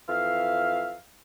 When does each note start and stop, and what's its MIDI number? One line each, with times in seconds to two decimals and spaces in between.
0.09 0.95 41
0.09 0.95 52
0.09 0.95 76
0.09 0.95 77